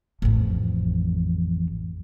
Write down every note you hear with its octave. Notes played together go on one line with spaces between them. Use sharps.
A1 F2